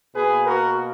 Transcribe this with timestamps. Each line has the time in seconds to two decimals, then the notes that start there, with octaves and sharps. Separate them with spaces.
0.15 B2 A#3 G#4 B4
0.47 F#4 A#4